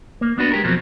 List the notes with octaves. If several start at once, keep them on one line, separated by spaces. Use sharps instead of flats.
A#3
B3 D4 F#4 B4
G#3 G4 A#4
F2 B2 F3 F#3 C4